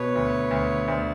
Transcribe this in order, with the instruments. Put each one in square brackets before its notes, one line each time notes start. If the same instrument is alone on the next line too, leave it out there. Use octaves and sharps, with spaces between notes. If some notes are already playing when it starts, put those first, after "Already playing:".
Already playing: [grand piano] B2 [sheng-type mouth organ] B4 C#5
[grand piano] D2
D2
[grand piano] D2 [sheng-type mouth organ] C5 D5